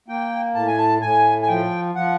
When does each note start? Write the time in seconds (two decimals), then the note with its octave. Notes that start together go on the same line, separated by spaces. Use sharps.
0.08 A#3 G5
0.55 A2 A5
0.67 G#5
0.78 A5
1.01 A2 G#5
1.42 G#5
1.48 F3 G5
1.95 F3 F#5